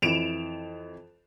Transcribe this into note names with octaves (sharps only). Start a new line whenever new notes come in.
F2 E3 D7 E7 F7